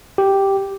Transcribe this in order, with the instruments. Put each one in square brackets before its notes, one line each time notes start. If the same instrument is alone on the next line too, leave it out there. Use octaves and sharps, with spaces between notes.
[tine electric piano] G4